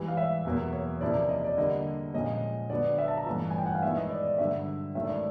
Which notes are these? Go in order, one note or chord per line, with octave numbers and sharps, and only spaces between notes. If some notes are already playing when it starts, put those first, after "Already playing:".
Already playing: G#2 E3 G3
F5
E5
E2 B2 F#3 A#3
C#5
C3 F3 A#3 C#4 E4 D5
D#5
D5
D3 G3 A#3 D#5
A#2 F3 G#3 C#4 D#5
D3 F#3 B3 D5
E5
A5
A#5
G2 E3 A3 C#4 F4 A5
G#5
G5
F#5
F5
D#3 G#3 B3 E4 E5
D#5
D5
D5
G2 D3 F#3 E5
G#2 D#3 F#3 A3 C#4 E5
D5